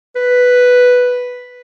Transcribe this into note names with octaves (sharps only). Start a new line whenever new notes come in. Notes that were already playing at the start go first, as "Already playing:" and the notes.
B4